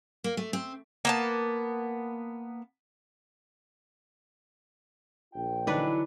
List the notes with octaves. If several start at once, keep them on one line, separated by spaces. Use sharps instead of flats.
A#3
A3
C4
A#3 B3 A5
A#1 F4 G5
D3 E3 F#3 D4 D#4 B4